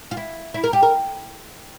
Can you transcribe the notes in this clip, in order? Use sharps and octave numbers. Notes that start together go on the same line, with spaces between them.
F4
E4
E4
A#4
G4
A#4